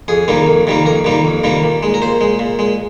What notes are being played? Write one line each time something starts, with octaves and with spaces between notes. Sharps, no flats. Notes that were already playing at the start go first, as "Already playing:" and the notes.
F2 G#4
C3 D#3 G3 A#3
F2
C3 D#3 G3 A#3
F2 A#4
C3 D#3 G3 A#3
F2
C3 D#3 G3 A#3
A#2
G#3
A#4
A#2 C5
G#3
A#2
G#3